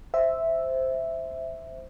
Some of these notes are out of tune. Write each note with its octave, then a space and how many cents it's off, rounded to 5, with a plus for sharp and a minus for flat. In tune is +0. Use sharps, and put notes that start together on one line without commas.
C5 +0 E5 +0